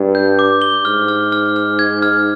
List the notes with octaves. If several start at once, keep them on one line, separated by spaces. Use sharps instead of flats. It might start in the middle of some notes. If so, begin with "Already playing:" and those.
Already playing: G2
G6
D6
G7
G#2 F6
F6
F6
F6
G#6
F6